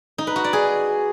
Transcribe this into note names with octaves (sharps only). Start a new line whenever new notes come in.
D#4
B4
F#4
D5
G#4